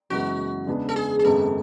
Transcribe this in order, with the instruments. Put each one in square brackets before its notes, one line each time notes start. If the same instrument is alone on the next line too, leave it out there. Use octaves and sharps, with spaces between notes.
[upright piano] F#1 F#2 E3 G#3 B3 [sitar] F#4
[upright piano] E2 C#3 G#3 B3 D4
[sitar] A4
G#4
G#4
[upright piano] G#1 F#2 C#3 G#3 B3 [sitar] A4